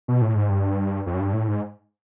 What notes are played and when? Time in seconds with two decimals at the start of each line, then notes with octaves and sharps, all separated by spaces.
0.08 B2
0.22 A2
0.35 G#2
0.50 G2
1.06 F2
1.14 F#2
1.20 G2
1.33 A2
1.48 G#2